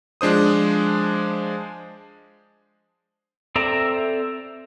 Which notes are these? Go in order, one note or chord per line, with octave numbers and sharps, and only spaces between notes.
F3 G#3 D4 C5 D#6
C4 A4 D5 E5 A#5